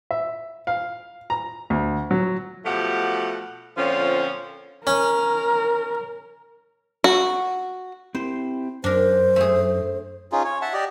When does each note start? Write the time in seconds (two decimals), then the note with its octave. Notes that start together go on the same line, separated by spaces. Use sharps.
0.11 E5
0.67 F5
1.30 A#5
1.70 D2
2.11 F#3
2.65 B2 F3 A3 G4 F#5
3.77 A#2 D3 F3 C4 C#4 C#5
4.87 C#4 A#4
7.04 F#4
8.15 C4 E4 G4 C5
8.84 F#2 D4 A#4 C5
9.36 A3 G#4
10.32 C#4 D#4 F4 G#4
10.44 C#5
10.62 E5 F#5 A5
10.73 G4 D5 D#5